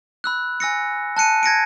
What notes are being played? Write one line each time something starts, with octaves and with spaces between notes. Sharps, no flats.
B5 E6 F#6
G#5 E6 A#6 C#7
A5 F#6 C#7 D#7
G#6 A#6 C#7 D7